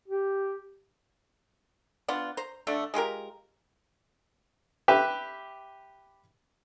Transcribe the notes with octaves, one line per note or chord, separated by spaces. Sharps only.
G4
B3 D4 F4 F#5
C5 A#5
D3 A3 D4
G#3 F4 G4 A#4
G4 B4 E5